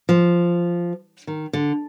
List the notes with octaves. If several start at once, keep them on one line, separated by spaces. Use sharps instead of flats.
F3
D#3
D3